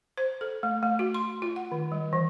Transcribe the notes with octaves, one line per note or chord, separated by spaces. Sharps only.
C5
A4
A3
A3
F#4
C6
F4
F#5
D#3
G3
E3